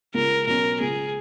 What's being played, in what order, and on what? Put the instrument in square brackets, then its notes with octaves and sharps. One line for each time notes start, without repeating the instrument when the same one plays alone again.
[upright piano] C#2 [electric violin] A#4
[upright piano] B2 F#3 C#4 [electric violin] A#4
[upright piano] C#2 [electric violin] G#4